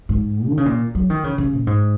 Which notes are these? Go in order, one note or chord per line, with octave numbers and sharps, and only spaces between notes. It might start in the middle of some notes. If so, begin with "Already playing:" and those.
G#2
D#3
C#3
A#2
F#3
D#3
C#3
C#3
A#2
G#2